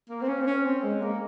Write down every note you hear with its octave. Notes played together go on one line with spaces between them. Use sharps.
A#3
C4
C#4
C4
C#4
C4
G#3
A#3